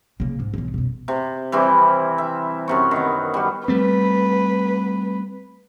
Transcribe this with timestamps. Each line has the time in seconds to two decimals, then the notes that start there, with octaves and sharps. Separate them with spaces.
0.20 C#3 A#3
0.40 G#2
0.54 B1 E3
0.74 F#2 B2
1.08 C3
1.52 E3 G3 C4 E4
2.18 E5
2.68 F#2 C3 C#6
2.91 D#3 B3
3.34 G3 F#4
3.68 G3 A3 C4 B4